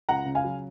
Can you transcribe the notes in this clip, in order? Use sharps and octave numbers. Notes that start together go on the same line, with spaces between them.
C#2 F#5 A#5
C#3
F5 G#5
F#3